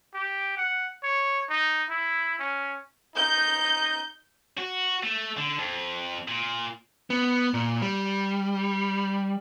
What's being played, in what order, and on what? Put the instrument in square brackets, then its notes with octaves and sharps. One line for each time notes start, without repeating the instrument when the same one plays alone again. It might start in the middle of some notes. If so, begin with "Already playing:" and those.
[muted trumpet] G4
F#5
C#5
D#4
E4
C#4
[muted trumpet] D#4 [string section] G6
[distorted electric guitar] F#4
A3
D3
F2
A#2
[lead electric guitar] B3
A#2
G3